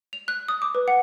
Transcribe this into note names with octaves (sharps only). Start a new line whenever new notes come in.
F7
F#6
D#6
D6
B4
F#5